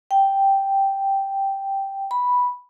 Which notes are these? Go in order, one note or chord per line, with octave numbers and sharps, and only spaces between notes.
G5
B5